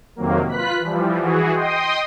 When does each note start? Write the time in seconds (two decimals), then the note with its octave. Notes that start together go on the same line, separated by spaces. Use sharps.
0.16 F2 C3 D#3 F#3 A#3
0.48 F4 B4 F#6 B6
0.80 E3 F3 G3
1.21 E3 F#4 G#4
1.52 D#5 G5 C6 D#6